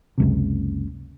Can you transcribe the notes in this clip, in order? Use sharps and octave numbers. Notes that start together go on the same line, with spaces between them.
F#1 C#2 C3